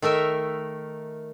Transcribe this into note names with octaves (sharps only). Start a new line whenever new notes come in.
D#3 A3 A#4 E5